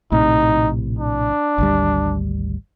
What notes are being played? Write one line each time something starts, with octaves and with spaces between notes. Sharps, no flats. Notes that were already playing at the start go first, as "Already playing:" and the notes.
A#1 A2 C3 D#4
D4
G#1 D2 G3